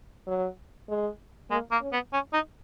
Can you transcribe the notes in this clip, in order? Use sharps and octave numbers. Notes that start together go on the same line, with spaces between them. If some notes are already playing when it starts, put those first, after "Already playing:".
F#3
G#3
G#3 A#3
A#3
C#4
B3
C#4
D#4